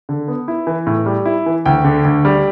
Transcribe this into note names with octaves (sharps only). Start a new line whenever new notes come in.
D3
B3
E4
E3
A2
G3
E4
E3
D2 G5
D3
D2
G3